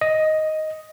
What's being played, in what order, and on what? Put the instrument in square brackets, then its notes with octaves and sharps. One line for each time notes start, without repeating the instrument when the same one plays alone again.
[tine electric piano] D#5